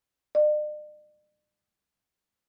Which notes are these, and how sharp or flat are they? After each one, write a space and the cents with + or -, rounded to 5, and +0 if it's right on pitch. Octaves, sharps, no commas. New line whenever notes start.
D5 +45